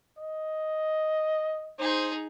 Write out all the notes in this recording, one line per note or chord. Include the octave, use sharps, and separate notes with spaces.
D#5
D#4 G#4 C5